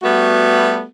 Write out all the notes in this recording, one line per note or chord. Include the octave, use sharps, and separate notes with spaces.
G3 A3 B3 F#4